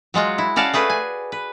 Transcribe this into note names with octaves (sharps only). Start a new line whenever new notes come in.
F#3 G#3 F4 F#4
E4
C#4 F#4 D5 F5 A5
A3 G#4 B4 D5
G#5
B4